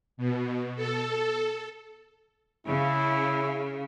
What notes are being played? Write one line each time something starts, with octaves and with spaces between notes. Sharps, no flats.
B2
A4
C#3 E4